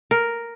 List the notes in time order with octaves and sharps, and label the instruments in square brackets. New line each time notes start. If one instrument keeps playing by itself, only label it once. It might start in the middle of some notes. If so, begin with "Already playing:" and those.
[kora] A#4